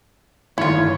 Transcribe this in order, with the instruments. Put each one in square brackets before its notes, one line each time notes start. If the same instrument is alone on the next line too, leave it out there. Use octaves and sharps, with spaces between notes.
[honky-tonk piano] G1 A2 [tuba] D#3 [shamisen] E4 F4 [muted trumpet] C#5